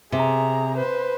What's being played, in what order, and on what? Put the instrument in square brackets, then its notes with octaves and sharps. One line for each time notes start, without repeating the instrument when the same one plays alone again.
[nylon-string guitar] C3 [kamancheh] G#4 A#5
[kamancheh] B4 C5